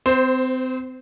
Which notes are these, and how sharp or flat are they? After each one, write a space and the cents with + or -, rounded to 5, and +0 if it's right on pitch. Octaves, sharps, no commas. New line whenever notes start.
C4 -30 C5 +0